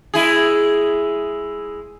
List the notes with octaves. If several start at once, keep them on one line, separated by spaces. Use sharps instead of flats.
G#3 E4 G#4